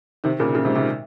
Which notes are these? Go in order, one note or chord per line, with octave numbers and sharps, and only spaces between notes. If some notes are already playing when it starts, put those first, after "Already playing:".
C3 D#3
A#2 C#3
A#2 C#3
G#2 C3
G#2 C3